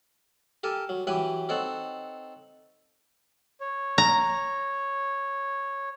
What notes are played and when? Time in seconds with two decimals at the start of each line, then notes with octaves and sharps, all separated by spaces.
0.63 G4 A4 A#4 G#5
0.89 F#3
1.07 E3 F#3 G4 B4 G5 G#5
1.49 C4 D#4 A4 C#5 F#5
3.60 C#5
3.98 A#5